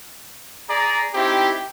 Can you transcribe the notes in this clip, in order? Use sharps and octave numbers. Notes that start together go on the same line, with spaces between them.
G#4 D5 A#5
C4 D#4 E4 G4